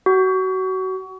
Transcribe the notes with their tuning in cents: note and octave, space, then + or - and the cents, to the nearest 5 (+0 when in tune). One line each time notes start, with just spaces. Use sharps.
F#4 +25